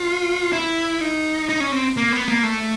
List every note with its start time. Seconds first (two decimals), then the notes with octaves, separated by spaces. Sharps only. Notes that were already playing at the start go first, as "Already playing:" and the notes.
Already playing: F4
0.53 E4
1.01 D#4
1.49 D#4
1.60 C#4
1.72 C4
1.97 A#3
2.12 B3
2.28 A#3
2.43 A3